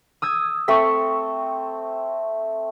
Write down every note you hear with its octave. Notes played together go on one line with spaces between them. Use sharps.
D#6 E6 G#6
A3 C4 C#6 B6